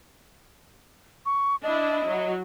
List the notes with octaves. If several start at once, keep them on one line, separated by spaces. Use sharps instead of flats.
C#6
D4 E4 D#5
F#3